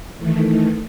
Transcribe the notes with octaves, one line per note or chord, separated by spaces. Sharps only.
D#3 E3 A3